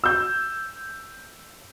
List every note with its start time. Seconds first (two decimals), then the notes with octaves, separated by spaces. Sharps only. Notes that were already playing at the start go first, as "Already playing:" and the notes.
0.04 E6 G6